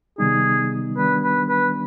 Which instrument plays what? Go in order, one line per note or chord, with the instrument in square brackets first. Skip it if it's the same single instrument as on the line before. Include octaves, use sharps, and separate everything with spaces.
[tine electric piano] C3 D#3 G3 B3 D#4 [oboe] G#4
[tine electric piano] D#3 G3 B3 D4 [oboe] B4
[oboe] B4
B4